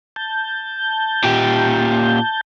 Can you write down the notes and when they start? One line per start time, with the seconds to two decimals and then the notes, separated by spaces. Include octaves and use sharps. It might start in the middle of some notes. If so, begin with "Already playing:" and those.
0.16 A5 G6
1.24 A#2 G4